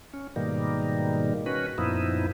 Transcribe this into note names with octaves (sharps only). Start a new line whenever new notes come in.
C#4
G#2 B2 D#3 G3 A#3
C#4 F#4 B4
F#2 A#2 F3 B3 D#4 E4